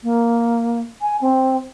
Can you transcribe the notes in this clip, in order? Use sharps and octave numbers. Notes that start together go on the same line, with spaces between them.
A#3
G#5
C4